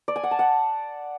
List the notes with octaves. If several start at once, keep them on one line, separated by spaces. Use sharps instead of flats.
D5
G#5
F#5
A5
F#5